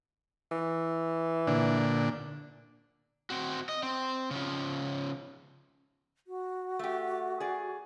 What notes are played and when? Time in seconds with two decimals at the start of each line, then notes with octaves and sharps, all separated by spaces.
0.52 E3
1.47 A#2 D3 D4
3.30 C4 F#4
3.69 D#5
3.83 C4
4.31 C#3 F3
6.27 F#4
6.79 A3 G4
7.40 G#4 D5